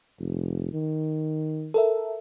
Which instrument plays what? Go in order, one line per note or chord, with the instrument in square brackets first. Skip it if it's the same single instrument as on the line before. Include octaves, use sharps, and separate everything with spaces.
[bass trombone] F1
D#3
[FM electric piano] A4 A#4 E5